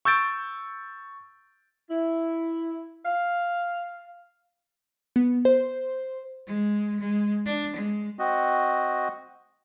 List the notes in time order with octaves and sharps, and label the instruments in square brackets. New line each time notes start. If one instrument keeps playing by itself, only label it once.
[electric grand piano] C#6 E6 G6 A6 D7
[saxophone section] E4
F5
[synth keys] B3
C5
[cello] G#3
G#3
D4
G#3
[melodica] C4 F#4 D#5